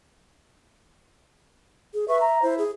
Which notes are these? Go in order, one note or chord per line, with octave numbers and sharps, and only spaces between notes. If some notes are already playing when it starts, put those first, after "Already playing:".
G#4
B4 E5 C#6
A#5
E4 C5
G#4